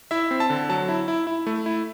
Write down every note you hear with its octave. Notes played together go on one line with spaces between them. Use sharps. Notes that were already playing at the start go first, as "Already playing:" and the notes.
E4 E5
C4
A5
D3
F#3 A5
E4
E4
E4
A3
E4